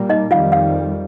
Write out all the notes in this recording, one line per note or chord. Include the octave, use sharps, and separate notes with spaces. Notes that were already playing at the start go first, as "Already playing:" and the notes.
Already playing: A#2 G3 A#3
D#4 D#5
F2 D#3 G3 F4 F5
F5